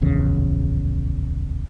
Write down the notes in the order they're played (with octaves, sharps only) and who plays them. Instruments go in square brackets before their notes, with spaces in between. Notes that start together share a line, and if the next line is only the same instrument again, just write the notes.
[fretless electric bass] D1 A#1 E2 C#3